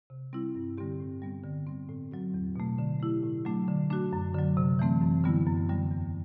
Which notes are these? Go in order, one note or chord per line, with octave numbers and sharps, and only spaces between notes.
C3
G3 C4 E4
G2
D3 G3 C4 G4
A2
G3 B3
D3
G3 C4
A2
F#3 C4 F#4
E2
B2 A3
D3
A3 E4 G4
A2
F#3 A3 D4
D3
A3 D4 F#4
F#2
D3 F#3
C3
E3 A3 C4
F#2
D3 G3 B3 E4
F#2
D3 G3
E2